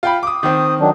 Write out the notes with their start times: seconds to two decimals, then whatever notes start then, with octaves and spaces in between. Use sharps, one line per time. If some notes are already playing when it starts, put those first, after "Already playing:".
0.03 F4 G5 B5
0.23 D6 D#6
0.43 D#3 C4 D#6
0.80 D#3 F#3 D4